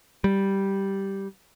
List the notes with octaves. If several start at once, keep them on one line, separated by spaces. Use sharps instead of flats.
G3